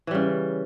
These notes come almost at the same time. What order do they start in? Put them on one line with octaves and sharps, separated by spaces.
E3 G3 C#3